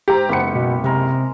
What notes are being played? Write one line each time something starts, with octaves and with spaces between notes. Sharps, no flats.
G#2 G4 A#5
F#1 B3 G4 C#7
B2
C3 G#3 A#4